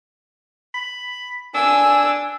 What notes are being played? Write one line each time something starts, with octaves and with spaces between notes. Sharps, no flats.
B5
D4 G#5 E6